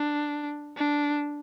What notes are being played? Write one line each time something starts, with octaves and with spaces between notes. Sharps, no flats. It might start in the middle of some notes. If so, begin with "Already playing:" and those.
Already playing: D4
D4